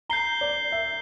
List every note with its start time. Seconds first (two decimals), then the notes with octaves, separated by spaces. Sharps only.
0.09 A#5 G6 C7 G7
0.41 D5
0.72 E5